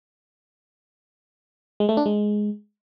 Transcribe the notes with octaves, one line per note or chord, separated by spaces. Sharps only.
G#3
A3
D4
G#3